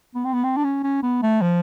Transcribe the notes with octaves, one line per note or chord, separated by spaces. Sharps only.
B3
C4
B3
C4
D4
C#4
C#4
B3
A3
F3